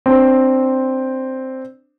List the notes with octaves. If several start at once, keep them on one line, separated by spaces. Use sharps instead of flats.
C4 D4 C5